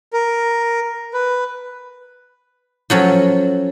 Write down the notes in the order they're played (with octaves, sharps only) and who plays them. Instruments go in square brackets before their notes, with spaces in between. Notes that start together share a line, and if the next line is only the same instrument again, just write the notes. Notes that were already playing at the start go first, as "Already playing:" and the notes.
[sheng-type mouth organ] A#4
B4
[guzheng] F3 F#3 C#4 A4